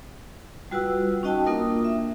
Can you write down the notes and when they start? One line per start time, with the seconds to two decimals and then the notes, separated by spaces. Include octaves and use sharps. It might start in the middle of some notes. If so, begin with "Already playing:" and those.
0.71 G3 F4 F#4 B4 F#5 E6
1.23 C#4 D#4 F#4 D#5 G5 A5
1.46 A#3 D4 F4 A#4 D#6
1.85 E5